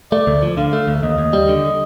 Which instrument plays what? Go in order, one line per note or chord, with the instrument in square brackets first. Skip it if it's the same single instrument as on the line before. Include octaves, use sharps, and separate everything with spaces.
[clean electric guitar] A3 [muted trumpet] D5
[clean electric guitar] D2
F3
[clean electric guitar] D3 [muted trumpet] F5
[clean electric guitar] A3
D2
[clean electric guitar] D#2 [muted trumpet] D#5
[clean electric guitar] D#2
G3
D3